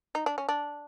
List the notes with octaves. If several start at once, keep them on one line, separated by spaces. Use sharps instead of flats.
D#4
D4
C#4
D4